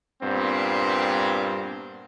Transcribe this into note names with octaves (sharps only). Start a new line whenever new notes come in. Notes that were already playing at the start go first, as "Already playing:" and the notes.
G2 A#2 B3 C4